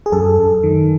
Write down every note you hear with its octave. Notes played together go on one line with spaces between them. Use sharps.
G#4
F#2 A4
F#2
D#3